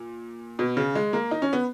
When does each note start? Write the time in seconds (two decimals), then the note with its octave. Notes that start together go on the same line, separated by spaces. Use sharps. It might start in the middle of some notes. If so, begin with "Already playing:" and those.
Already playing: A#2
0.59 B2
0.77 C#3
0.95 G#3
1.13 A#3
1.31 D#4
1.42 C#4
1.53 B3